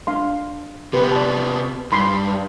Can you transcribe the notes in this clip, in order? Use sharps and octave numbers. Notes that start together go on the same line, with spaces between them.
D4 F5 C6
C3 B3 G4 B4
D5 A5
G2 B5 C6